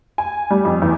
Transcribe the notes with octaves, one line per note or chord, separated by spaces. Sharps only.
G#5
G3
F2
E2